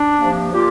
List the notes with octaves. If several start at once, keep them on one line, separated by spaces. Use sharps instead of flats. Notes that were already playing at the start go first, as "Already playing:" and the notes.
Already playing: D4
C3 F3 A#3
A#2 A#3 F4 G4